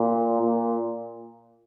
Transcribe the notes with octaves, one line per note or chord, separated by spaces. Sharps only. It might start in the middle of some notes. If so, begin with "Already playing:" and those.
Already playing: A#2
A#2